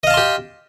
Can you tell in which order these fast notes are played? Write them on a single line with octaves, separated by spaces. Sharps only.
D#5 F5 A5 C6 G4